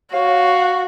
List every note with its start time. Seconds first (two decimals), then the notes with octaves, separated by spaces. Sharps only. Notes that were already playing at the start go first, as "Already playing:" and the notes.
0.13 F#4 C#5 F5